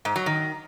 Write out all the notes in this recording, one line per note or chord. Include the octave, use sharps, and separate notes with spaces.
G#2
F#3
D#3